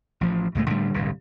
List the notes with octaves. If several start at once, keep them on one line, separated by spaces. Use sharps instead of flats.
A1 F3
C#2 A2 G#3 A3
A2 D3 G3 A3
D1 G1 C2 G2